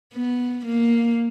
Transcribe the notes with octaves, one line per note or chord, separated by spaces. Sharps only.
B3
A#3